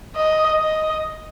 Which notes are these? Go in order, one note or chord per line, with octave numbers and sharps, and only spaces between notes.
D#5
D#5